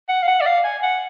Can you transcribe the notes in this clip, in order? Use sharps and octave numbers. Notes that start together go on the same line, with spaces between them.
F#5
F5
F#5
D5
F5
G#5
F#5